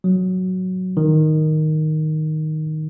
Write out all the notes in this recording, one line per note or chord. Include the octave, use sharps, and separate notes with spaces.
F#3
D#3